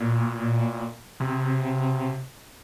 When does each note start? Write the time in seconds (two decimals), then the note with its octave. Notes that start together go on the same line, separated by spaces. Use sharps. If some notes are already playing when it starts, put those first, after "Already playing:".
Already playing: A#2
1.20 C3